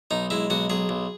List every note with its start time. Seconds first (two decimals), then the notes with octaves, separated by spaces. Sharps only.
0.11 B1 D#4
0.30 G#3 E4
0.50 B1 F#4
0.70 B1 G#4
0.89 B1